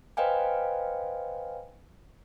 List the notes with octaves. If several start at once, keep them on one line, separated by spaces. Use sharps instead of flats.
B4 C5 D#5 F5 G5 G#5